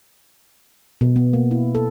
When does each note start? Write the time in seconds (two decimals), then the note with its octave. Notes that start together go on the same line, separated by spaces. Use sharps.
1.01 B2
1.16 B3
1.33 A#3
1.51 E4
1.75 A4